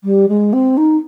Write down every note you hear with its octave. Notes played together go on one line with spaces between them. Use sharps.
G3
G#3
C4
D#4